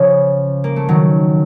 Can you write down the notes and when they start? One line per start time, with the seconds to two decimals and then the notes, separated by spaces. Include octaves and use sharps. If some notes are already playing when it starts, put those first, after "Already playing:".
Already playing: C#3 F3
0.64 A#3
0.76 A3
0.89 D#3 F#3